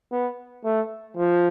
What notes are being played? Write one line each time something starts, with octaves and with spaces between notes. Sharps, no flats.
B3
A3
F3